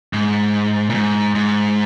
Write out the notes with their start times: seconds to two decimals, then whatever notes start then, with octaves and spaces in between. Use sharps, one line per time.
0.13 G#2
0.90 A#2
0.94 G#2
1.35 G#2